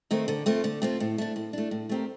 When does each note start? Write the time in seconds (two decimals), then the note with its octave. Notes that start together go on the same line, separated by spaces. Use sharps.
0.11 D#3 A3 C4
0.28 D3
0.46 A3 C4 F4
0.64 D3
0.82 A3 C4 F4
1.00 A2
1.18 A3 D4
1.36 A2
1.53 A3 D4
1.71 A2
1.89 A3 C4 G4 A#4